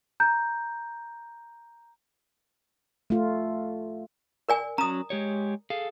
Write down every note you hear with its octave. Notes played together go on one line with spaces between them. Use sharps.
A#5 G6
A3 F4
A#4 D5 G#5
F#3 C#4 A#5 D#6
G#3 G4 C#5
G#4 A4 F5